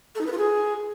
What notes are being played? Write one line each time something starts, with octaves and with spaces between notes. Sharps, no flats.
A4
D#4
B4
F4
G#4